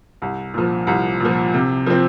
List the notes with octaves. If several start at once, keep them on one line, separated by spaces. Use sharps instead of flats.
C2
A#2 F3
C2
A#2 F3
C3
F3 C4